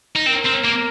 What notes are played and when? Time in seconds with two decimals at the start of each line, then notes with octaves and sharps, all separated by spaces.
0.16 D#4
0.26 C4 A#4
0.45 C4
0.64 A#3